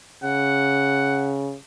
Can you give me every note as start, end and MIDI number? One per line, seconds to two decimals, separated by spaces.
0.24 1.56 49
0.24 1.37 78